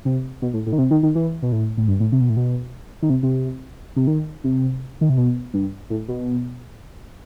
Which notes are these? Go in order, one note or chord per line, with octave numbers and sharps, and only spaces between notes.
C3
B2
A2
A2
D#3
C3
D#3
D#3
E3
B2
A2
A2
G2
A2
C3
B2
A2
B2
D#3
C3
C3
C3
D#3
C3
D#3
C3
B2
G2
A2
B2